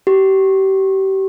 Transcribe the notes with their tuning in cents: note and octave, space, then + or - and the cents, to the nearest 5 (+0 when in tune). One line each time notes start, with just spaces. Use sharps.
G4 -30